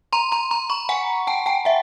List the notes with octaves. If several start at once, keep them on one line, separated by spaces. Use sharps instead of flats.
A#5 C6
A#5 C6
A#5 C6
B5 C#6
F#5 G#5
G5 A5
G5 A5
E5 F#5